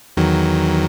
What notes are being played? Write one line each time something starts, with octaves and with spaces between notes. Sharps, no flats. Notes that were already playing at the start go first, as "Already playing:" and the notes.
E2 D#3 F#3